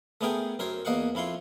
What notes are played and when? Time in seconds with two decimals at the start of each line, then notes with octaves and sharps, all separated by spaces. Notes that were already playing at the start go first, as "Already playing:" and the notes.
0.21 A3 B3 C#4 G#4 A#4 G5
0.59 F#2 A#4 C5 C#5
0.85 E2 A#3 D#5 F5 F#5 C#6
1.15 F2 E4 F4 C6 C#6